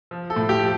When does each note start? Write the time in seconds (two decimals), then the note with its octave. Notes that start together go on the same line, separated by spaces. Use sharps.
0.11 F3
0.30 A4
0.36 A2
0.49 G4
0.61 F3